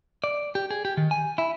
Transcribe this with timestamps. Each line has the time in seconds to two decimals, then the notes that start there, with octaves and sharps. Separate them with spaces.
0.24 D5
0.55 G4
0.71 G#4
0.85 G4
0.97 D#3
1.11 G#5
1.38 E4